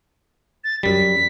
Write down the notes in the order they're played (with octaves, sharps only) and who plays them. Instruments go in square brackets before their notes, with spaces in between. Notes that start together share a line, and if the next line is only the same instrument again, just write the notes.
[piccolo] A6
[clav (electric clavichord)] F#2 G3 [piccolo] B6